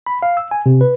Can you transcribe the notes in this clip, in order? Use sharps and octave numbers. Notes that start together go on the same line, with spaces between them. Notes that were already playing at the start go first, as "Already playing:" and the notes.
B5
F5
E6
G#5
C3
B4